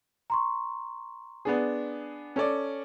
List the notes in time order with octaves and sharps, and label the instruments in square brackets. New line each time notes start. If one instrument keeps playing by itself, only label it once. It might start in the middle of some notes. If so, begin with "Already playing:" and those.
[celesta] A#5 C6 C#6
[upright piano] B3 D4 G#4
C#4 A4 D5